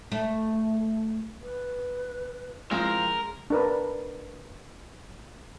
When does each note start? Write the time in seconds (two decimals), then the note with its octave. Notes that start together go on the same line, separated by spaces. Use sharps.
0.12 A3
1.42 B4
2.71 F3 G#3 C4 F4 A#4
3.50 D4 A#4 B4